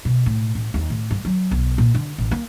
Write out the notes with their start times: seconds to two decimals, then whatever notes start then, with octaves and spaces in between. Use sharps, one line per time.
0.05 B2
0.26 A2
0.55 A1
0.74 D#2
0.90 A2
1.11 G2
1.25 F#3
1.51 B1
1.78 A#2
1.95 D3
2.18 A1
2.31 A#3